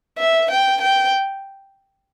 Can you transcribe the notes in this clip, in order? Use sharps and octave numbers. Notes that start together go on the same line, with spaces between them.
E5
G5
G5